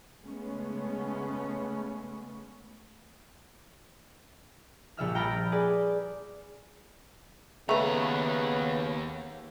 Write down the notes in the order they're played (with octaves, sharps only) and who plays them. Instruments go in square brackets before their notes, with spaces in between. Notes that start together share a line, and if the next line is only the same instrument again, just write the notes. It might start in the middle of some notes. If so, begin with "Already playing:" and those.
[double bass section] C#3 G#3 A3 B3 C#4
[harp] A#1 G3 E5 F6
G5 A#5 B5 F6 A6 D7
G#4 B4 D5
[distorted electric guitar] D#2 A#5 [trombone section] C#3 B3 [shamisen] A3 B4